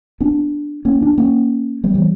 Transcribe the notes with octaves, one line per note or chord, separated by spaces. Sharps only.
B3 D4
A#3 C#4
B3 D4
A#3 C#4
G3 B3
E3 G3